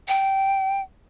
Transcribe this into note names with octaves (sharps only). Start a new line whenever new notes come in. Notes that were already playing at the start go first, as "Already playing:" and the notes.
G5